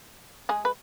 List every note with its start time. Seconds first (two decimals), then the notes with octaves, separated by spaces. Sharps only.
0.49 G#3 G#4
0.65 B4